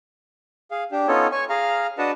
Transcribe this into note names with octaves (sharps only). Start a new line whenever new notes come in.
G#4 F5
D4 G4
B3 C#4 D#4 F4 A4 C#5
C#5 G#5 C#6
G#4 F5 A#5 F6
D4 F#4 B4 D#5 F#5 A5